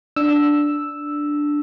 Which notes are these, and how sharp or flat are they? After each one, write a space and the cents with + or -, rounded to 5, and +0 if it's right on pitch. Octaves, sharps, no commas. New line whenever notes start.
D4 +0 E6 +0